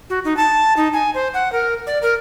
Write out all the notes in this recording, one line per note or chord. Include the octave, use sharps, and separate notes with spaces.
F#4
D#4
A5
D#4
G#5
C5
F#5
A#4
D5
A#4